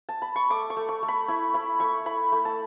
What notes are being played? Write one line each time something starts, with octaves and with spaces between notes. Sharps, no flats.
A5
B5
C#6
A3 D6
C#6
A3
C#6
A3
B5
E4 C#6
E4 B5
A3 C#6
E4 B5
A3
A5